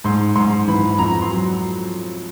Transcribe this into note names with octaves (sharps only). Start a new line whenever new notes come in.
G#2 C6
G#2 C6
E3 B5
B5
F2 A#5
C6
F#3